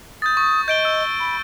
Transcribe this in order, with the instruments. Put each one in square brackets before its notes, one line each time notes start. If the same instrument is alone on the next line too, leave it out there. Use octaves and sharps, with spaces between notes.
[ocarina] D#6 [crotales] G6 A6
[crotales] C#6
[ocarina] D#5 [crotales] G6 D7 G7
[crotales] E6
[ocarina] B5